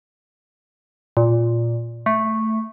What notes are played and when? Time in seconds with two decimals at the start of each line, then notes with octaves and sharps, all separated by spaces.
1.17 A#2
2.06 A3